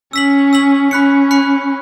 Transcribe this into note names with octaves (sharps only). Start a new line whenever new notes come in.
C#4 E6 B6 F#7
E6 B6 F#7
C#4 B5 F#6 C#7
B5 F#6 C#7